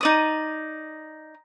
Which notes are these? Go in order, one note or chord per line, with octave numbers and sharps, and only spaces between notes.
D#4 D5 D#6